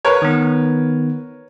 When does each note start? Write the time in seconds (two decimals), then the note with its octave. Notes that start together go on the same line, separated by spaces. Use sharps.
0.05 A#4 B4 C#5
0.22 D#3 B3